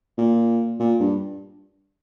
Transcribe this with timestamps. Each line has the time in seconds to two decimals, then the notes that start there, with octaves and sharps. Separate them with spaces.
0.18 A#2
0.80 A#2
1.00 G2